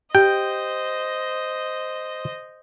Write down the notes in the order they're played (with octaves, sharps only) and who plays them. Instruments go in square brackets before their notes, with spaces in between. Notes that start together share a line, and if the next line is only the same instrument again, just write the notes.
[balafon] G4 [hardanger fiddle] C5 D#5 [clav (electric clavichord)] G5